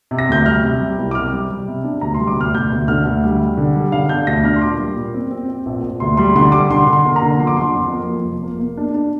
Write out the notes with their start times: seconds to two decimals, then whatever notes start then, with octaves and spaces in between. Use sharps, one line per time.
0.11 C3
0.19 A#6
0.29 D2 G6
0.45 G3 F6
0.63 C3
0.81 G3
0.99 C2
1.11 D6
1.15 C3 F6
1.32 G3
1.50 G3
1.68 C3
1.84 D4
2.01 D2 A#5
2.14 G3 C6
2.28 D6
2.36 D2 F6
2.54 D2 G6
2.72 D2
2.88 D3 F6
3.06 D2
3.24 G3
3.41 G3
3.57 D3
3.76 G3
3.92 D3 F5
4.09 D4 G6
4.27 D2 A#6
4.44 D4 F6
4.56 C6
4.62 A#2 D6
4.80 G3
4.96 A#2
5.14 C4
5.31 C4
5.49 C4
5.66 A#1
5.83 A#1
6.00 D2 C6
6.17 G3 C6
6.35 D3 C6
6.45 C6
6.52 G3 D6
6.70 D3 C6
6.87 D3
6.93 C6
7.05 A#3
7.16 A#5
7.22 D3
7.39 F3 C6
7.47 D6
7.57 F3 C6
7.74 F2
7.92 A#3
8.09 F3
8.25 F1
8.43 A#3
8.60 A#3
8.77 D4
8.95 D4